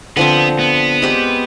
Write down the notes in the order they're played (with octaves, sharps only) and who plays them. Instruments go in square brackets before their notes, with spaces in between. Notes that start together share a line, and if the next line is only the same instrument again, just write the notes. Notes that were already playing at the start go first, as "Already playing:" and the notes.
[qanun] D3 F3 C4 [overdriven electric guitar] B3
[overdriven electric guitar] B3
[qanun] G#3 C4 G4 B4